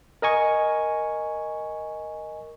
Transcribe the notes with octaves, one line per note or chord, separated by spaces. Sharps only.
A#4 D#5 G#5 C#6